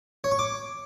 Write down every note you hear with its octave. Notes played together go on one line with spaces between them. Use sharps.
C#5
C#6
D6